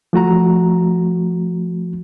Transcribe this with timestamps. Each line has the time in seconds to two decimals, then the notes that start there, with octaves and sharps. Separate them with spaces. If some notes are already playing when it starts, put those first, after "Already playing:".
0.13 F3 A3 F#4 A#5